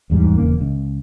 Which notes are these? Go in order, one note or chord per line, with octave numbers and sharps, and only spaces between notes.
D1 E2 G#2 G3
D#1 E2 C#3 A#3
C#2